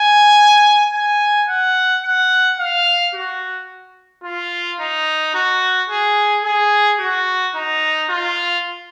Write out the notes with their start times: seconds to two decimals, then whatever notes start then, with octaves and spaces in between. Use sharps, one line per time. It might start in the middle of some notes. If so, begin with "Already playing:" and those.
Already playing: G#5
0.94 G#5
1.49 F#5
2.04 F#5
2.60 F5
3.15 F#4
4.24 F4
4.80 D#4
5.34 F#4
5.90 G#4
6.45 G#4
7.00 F#4
7.55 D#4
8.10 F4